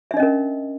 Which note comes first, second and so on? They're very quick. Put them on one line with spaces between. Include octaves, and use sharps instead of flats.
E5 D4 D#5 C#4 A#4